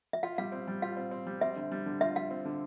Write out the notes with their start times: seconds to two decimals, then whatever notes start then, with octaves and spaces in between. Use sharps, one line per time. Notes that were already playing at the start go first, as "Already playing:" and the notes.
0.13 E5
0.23 F4 F5
0.38 G3 F5
0.52 C4
0.68 G3
0.82 F4 F5
0.97 C4
1.11 C4
1.27 G3
1.41 C4 E5
1.56 D3
1.72 G3
1.86 D3
2.00 F4 E5
2.16 F4 F5
2.31 C4
2.45 D3